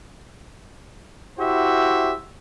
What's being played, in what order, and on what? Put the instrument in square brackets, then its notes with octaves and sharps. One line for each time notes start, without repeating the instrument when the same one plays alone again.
[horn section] E4 F#4 G4 C5 E5